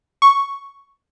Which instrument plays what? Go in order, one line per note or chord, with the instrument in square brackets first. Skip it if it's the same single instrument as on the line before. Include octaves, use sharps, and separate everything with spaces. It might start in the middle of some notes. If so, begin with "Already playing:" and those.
[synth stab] C#6